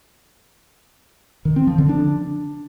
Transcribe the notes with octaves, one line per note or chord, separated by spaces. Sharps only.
D#3
C4
F3
D3
D4